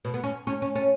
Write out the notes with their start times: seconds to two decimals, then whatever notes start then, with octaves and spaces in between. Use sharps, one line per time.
0.05 B2
0.14 B3
0.24 C#4
0.47 C#4
0.62 C#4
0.75 C#4